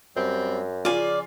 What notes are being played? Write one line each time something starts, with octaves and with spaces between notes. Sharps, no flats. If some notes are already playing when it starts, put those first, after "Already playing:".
F#2 G3 C4
C#3 F3 F4 D5 G#5